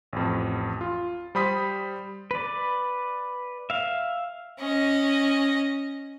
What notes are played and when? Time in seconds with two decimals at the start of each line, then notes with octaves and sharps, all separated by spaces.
0.13 A1 F2
0.81 F4
1.35 G3 C5 B5 D#6 B6
2.31 B4 D5
3.70 E5 F5
4.60 C#4 D#5